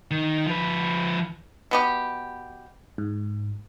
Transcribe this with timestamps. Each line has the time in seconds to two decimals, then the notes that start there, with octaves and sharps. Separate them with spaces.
0.11 D#3
0.46 F3 B4
1.71 B2 B3 G4
2.98 G#2